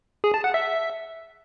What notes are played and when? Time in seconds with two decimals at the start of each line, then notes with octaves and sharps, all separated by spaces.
0.24 G#4
0.34 A5
0.44 F#5
0.54 E5